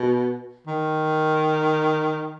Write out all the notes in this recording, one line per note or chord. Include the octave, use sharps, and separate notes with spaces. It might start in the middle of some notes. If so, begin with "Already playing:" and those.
Already playing: B2
D#3